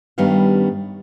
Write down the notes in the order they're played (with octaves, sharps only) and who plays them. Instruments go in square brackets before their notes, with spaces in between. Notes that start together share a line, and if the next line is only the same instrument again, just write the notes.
[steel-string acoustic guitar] G2 D#3 G3 B3 C#4 F5